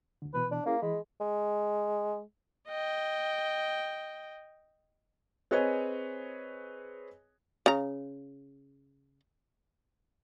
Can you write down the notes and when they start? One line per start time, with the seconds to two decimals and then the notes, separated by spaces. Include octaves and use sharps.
0.22 D2 D3
0.34 B2 E3 B4
0.51 D4
0.66 A#3 C#4 E4 G#4
0.82 E3 G#3 B5
1.21 G#3
2.68 D#5 G5
5.51 C4 G#4 B4 C#5 D#5 G#5
7.66 C#3 A#5